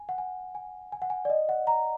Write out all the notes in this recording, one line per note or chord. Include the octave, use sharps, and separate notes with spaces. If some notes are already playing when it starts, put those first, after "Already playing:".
Already playing: G#5
F#5
G#5
G#5
G#5
F#5
G#5
D5
D#5
F#5
A#5